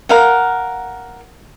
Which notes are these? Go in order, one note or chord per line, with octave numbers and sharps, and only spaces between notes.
A#4 F5 F#5